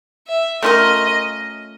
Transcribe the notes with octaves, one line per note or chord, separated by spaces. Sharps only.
E5
A3 C#4 F4 A#4 D#5